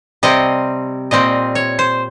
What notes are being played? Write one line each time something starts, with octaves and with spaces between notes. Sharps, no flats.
C3 G3 C4 D#5
A#2 G3 C4 D#5
C#5
C5